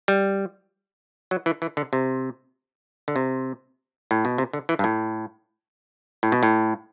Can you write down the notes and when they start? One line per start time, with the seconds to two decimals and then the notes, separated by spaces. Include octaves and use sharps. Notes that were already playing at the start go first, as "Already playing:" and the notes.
0.08 G3
1.31 F#3
1.46 E3
1.62 E3
1.77 D3
1.93 C3
3.08 D3
3.16 C3
4.11 A2
4.25 B2
4.38 C3
4.53 D3
4.69 E3
4.79 G2
4.84 A2
6.23 A2
6.32 B2
6.43 A2